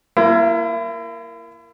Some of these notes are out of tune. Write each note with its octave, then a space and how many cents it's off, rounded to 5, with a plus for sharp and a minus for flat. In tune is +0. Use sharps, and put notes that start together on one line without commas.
A#3 +0 E4 +35